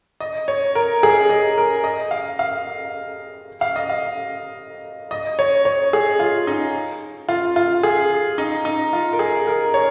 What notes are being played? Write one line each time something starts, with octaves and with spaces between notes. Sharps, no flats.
D#5
C#5
A#4
G#4
D#5
A#4
D#5
F5
F5
F5
D#5
F5
D#5
C#5
C#5
G#4
F4
D#4
F4
F4
G#4
D#4
D#4
F4
A#4
G#4
A#4
C#5